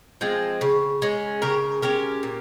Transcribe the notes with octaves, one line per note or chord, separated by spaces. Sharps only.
F3 G#3 C4
C#3
G#3 C#4
C#3 G4 A#4
G#3 C#4 G4 A#4
A#2